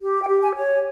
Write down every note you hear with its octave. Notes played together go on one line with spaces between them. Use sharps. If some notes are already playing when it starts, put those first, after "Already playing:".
G4
G5
G4
G#5
C#5